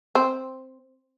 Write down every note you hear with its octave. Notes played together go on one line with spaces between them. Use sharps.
C4